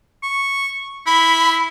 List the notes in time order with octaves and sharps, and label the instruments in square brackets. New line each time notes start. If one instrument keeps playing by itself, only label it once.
[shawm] C#6
[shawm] E4 [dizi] B5